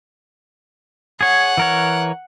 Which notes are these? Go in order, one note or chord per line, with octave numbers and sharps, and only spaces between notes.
G#4 C#5 F#5
E3 A#4 C#5